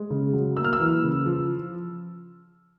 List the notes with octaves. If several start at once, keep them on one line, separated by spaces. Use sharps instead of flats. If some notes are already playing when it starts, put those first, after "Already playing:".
Already playing: G#3
C#3
F#3
A#3 E6
F6
E6
E3
C#3
F3